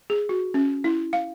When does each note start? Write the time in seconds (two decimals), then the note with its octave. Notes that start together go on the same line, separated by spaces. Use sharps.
0.10 G#4
0.29 F#4
0.54 C#4
0.84 E4
1.13 F5